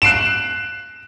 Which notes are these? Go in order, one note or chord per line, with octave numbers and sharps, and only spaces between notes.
F#6 C7 D7 E7